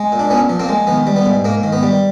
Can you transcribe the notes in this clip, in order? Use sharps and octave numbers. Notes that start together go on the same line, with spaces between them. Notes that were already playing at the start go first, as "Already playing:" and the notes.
Already playing: G#3
A#2
D4
A#2 B3 C#4
F3
A#3 C4
G#3
D#3 B3
G3
B3
G#2
G#2 A#3
D#3
B3
G3